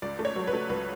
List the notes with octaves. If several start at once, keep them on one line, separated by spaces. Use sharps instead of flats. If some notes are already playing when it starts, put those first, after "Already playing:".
C#2 D5
A3
C#5
F#3
B4
A3
C#2 B4